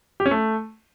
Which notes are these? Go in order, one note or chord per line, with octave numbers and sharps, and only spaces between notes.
G4
C#4
A3